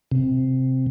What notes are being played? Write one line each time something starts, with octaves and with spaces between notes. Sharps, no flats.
C3